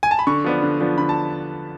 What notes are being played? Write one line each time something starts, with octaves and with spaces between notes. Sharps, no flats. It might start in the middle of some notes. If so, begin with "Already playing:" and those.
G#5
A5
B5
D3 C#6
F3 B3 D4
D3
F3 B3 D4
D3 B5
A5